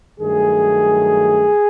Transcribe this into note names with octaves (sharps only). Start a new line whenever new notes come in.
G2 D#3 F#3 A3 G#4